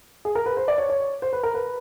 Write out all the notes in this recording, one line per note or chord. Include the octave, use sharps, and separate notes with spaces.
G#4
A#4
B4
C5
D5
C#5
C#5
C5
B4
A#4
B4